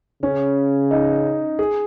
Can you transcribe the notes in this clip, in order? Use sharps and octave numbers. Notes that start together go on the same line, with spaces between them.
C#3 C#4
D#4
G#4